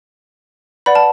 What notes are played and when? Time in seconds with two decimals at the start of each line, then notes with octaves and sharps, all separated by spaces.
0.86 B4 D5 F#5 B5
0.95 A5